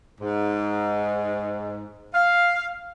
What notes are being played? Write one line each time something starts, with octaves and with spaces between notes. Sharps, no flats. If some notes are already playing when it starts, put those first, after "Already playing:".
G#2
F5